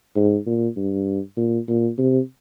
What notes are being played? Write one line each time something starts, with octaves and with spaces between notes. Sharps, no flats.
G#2
A#2
G2
A#2
A#2
C3